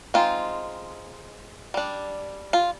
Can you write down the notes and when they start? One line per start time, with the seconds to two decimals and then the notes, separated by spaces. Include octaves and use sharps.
0.14 G#3 C4 D#4 F4
1.74 G3 D4
2.53 F4